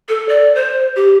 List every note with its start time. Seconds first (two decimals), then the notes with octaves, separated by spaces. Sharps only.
0.09 A4
0.29 D5
0.55 C5
0.96 G4